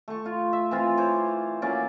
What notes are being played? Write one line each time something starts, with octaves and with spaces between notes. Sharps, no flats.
A3 C#6
F4
E5
E3 C4 F4
C5 C#5 D6
F#3 A#3 C#4 D5